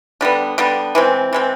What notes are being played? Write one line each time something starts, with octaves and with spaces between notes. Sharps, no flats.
D3 G3 B3
D3 G3 B3
E3 G#3 C4
E3 G#3 C4